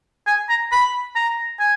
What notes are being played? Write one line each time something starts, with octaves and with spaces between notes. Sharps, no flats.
G#5
A#5
B5
A#5
G#5